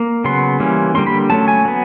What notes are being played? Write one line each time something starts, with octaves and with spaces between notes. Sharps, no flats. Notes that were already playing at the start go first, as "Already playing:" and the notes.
Already playing: A#3
C#3 F#3 B3 C6
E3 G3 A#3 C#4
D3 G3 A#3 C#4 C6
B5
F#3 A3 C#4 A5
G#5
F#3 B3